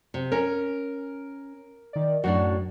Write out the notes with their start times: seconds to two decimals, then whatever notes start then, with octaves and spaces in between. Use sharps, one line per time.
0.14 C3
0.32 C#4 A#4
1.93 D#3 D5
2.24 F#2 A2 D4 F#4